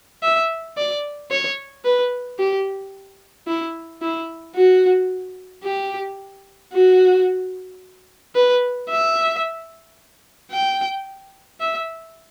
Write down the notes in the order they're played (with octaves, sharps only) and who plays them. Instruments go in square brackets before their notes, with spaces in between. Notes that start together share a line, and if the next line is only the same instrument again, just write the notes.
[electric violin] E5
D5
C#5
B4
G4
E4
E4
F#4
G4
F#4
B4
E5
G5
E5